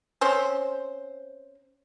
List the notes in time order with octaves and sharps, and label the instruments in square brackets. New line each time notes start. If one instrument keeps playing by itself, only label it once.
[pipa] C4 C#4 C5